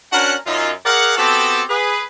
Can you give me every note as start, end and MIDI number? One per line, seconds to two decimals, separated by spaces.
0.13 0.35 61
0.13 0.35 62
0.13 0.35 66
0.13 0.35 70
0.13 0.35 78
0.47 0.71 42
0.47 0.71 63
0.47 0.71 65
0.86 1.17 68
0.86 1.17 70
0.86 1.17 74
0.86 1.17 77
0.86 1.17 78
1.18 1.63 59
1.18 1.63 60
1.18 1.63 66
1.18 1.63 67
1.18 1.63 69
1.69 2.03 68
1.69 2.03 71